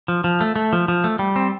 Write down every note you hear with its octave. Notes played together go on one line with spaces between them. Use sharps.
F3
F3
A3
A3
F3
F3
A3
G3
C4